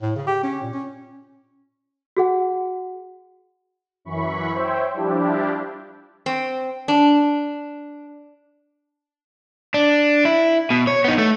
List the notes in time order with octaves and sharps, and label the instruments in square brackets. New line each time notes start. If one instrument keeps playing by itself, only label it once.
[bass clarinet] A2
C#3
G4
C#4
A#2
C#4
[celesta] F#4 G#4 F#5
[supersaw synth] F#2 E3 B5 C#6
C5 C#5 E5 G5
F3 G3 D4 E4 G4
[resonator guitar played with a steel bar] C4
D4
[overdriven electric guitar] D4
E4
B2
C#5
B3 D#4
A3